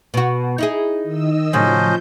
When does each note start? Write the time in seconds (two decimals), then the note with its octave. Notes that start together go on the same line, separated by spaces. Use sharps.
0.14 B2 F#4
0.58 D#4 E4 G#4
1.03 D#3 D#5 E6
1.53 A2 C#3 F3 F#3 C#4 C5 D#5 G6